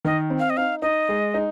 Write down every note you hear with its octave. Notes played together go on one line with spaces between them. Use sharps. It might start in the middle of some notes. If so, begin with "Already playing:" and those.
D#3 D#5
C4
F5
D#5
D#4 F5
D#4 D#5
G#3
D#4